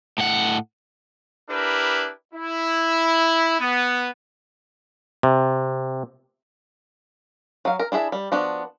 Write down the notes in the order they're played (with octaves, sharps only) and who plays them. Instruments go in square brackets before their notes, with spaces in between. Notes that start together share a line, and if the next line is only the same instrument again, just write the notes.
[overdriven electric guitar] A2 F#5
[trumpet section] D4 E4 G4 A#4 B4
E4
B3
[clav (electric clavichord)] C3
[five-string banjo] F#3 F5
A#4
D4 E4 G#4 E5
G3
F3 B3 D4 F#4